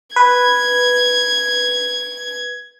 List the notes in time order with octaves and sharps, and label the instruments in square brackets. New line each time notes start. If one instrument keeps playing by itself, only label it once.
[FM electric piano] B4 [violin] G#6